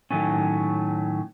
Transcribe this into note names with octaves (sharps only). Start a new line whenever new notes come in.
A2 D#3 F#3 A3 C#4